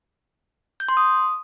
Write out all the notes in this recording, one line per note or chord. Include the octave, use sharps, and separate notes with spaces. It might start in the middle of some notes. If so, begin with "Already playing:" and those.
G6
C6
D#6